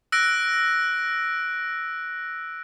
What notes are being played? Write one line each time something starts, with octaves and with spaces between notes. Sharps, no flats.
E6 F#6 A#6 D7